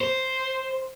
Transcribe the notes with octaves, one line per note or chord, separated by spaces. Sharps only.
C5